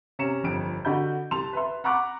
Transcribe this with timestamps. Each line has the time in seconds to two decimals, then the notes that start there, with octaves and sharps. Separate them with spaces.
0.19 C3 C#4 A#5 C#7 E7
0.44 G1 F2 D7
0.85 D3 F#4 D#5 B5 G6
1.31 C2 A5 C6 F7
1.53 B4 E5 C6
1.84 F#5 A#5 B5 C#6 D6 F#6